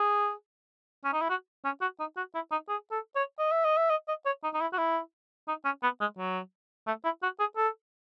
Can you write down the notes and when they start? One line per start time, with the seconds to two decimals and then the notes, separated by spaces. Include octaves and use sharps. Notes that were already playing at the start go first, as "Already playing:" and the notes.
Already playing: G#4
1.05 C#4
1.13 D#4
1.21 E4
1.30 F#4
1.65 C#4
1.81 F#4
2.00 D#4
2.17 F#4
2.35 E4
2.51 D#4
2.69 G#4
2.92 A4
3.16 C#5
3.39 D#5
3.52 E5
3.65 D#5
3.77 E5
3.90 D#5
4.08 D#5
4.26 C#5
4.43 D#4
4.54 D#4
4.61 E4
4.73 F#4
4.78 E4
5.48 D#4
5.65 C#4
5.83 B3
6.01 G#3
6.18 F#3
6.87 A3
7.04 E4
7.23 F#4
7.40 G#4
7.57 A4